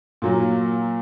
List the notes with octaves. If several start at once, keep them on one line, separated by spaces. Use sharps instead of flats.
A#2 F#3 A#3